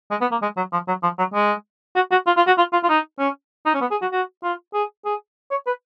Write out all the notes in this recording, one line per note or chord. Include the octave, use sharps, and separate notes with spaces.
G#3
B3
A#3
G#3
F#3
F3
F#3
F3
F#3
G#3
F#4
F#4
F4
F4
F#4
F4
F4
F4
D#4
C#4
D#4
C#4
B3
G#4
F#4
F#4
F4
G#4
G#4
C#5
B4